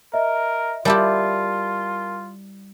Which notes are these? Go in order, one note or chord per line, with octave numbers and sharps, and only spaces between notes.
A#4 D#5 E5
G3 E4 F4 G4 A#4 A5